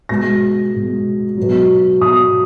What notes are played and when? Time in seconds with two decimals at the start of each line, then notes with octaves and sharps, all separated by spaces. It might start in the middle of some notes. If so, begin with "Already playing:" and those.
0.09 B2 G#3 A#6
0.73 B2 G#3
1.37 B2 F#3
2.01 B2 F#3 D#6